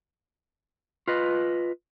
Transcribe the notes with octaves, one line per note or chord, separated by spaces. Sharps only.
F4 B4 D#5